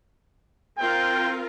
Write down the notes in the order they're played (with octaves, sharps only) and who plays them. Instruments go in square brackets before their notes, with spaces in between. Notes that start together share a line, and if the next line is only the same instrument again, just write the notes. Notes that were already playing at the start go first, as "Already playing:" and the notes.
[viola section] C4 F4 A#4 [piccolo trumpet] G5